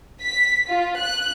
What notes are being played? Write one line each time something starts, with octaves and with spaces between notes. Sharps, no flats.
B6
F4
F#6